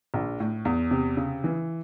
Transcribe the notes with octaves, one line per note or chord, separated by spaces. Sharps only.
A#1
A2
E2
C3
C#3
E3